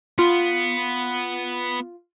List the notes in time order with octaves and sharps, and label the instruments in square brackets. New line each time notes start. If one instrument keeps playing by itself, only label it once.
[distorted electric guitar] B3 [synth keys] F4